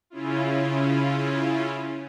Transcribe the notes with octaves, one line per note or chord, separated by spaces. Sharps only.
C#3 C#4 E4 F4